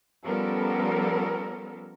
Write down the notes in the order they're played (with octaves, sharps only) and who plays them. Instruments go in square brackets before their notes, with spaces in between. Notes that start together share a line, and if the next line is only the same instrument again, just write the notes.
[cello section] F3 G3 B3 C#4 A4 A#4